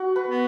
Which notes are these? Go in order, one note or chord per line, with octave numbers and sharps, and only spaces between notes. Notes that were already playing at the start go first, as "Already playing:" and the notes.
Already playing: F#4
B4
B3